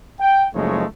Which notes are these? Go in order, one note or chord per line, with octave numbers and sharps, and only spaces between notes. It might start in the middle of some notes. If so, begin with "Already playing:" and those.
G5
F#1 F3 G#3 A3 D#4 C#5